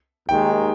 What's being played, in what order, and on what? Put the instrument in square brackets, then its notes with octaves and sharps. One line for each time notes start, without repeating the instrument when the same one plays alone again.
[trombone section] D#2 D#3 G#3 [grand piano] G5